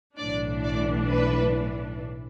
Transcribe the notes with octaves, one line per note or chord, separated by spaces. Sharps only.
B1 A2 E3 D4 D5
D5
B4